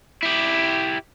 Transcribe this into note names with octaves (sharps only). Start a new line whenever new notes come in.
E4 G4